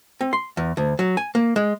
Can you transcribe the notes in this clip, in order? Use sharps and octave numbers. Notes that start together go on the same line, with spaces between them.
C4
C6
E2
D2
F#3
G#5
A#3
G#3